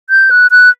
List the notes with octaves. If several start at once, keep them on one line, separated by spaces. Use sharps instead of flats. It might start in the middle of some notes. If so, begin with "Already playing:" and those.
G6
F#6
F#6